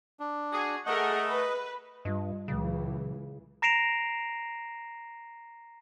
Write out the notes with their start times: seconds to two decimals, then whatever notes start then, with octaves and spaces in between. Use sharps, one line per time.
0.20 D4
0.52 F#4 G#4
0.86 A3 G#4 A#4 D#5 F#5
1.27 B4
2.05 G2 G3 F4 D#5
2.48 C#2 A#2 C#3 E3 F#3
3.62 A#5 A#6 C7 D7 E7 F7